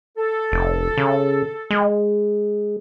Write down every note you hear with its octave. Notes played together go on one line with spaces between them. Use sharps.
A4
F1
C#3
G#3